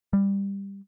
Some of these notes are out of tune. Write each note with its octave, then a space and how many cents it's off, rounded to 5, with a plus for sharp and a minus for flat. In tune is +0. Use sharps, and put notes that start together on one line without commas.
G3 +15